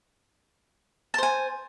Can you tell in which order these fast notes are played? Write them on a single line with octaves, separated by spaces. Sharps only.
A5 C5 G#5